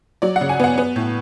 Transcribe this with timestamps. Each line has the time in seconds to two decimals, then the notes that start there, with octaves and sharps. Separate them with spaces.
0.22 F#3 D5
0.36 F#5
0.41 C#3
0.49 G#5
0.60 B3 F#5
0.78 B3
0.96 A2